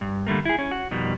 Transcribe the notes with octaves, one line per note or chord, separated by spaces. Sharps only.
G2
D3 G3 A3 A#3
E4 G#4
C#4
F#4
F2 B2 D#3 G3